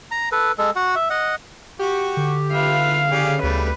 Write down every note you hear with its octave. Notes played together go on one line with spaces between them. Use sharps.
A#5
A4 B4
G#3 A4
F#4 F#5
E5
D#5 F#5
F#4 G4 C#6
D3
F4 B4 E5 F5
C#3 G4 G#4 D5
D2 G3 A3 B4